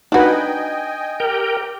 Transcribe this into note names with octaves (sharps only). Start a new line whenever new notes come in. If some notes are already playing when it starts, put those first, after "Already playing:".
D4 D#4 F#4 B4 D#5 G5 G#5
G4 A#4 G5